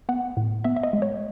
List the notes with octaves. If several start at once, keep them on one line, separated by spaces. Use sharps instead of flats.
B3 F#5
A2
B3 E5
E5
D#5
G#3
C#5